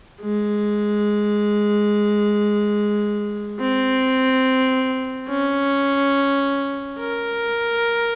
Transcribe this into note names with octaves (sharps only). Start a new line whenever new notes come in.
G#3
C4
C#4
A#4